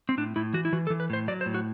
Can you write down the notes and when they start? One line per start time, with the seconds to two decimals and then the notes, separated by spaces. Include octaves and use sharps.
0.09 C4
0.17 A2 D4
0.36 A2 E4
0.53 E3 F#4
0.65 E4
0.73 E3 F#4
0.87 A4
0.90 E3
1.00 B4
1.10 A2 C5
1.28 F#3 D5
1.41 C5
1.46 A2
1.54 F#4